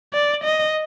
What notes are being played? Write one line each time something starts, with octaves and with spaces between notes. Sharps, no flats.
D5
D#5